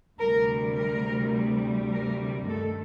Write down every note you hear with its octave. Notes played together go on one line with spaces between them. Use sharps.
D2 C3 G3 A#4
A#4
A#4
G2 D#3 A3 A4